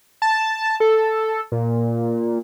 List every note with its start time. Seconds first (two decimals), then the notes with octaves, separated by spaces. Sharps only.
0.22 A5
0.80 A4
1.52 A#2